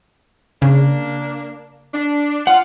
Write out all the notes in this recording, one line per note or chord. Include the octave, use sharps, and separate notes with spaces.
C#3 A#3 D4
D4
F4 F#5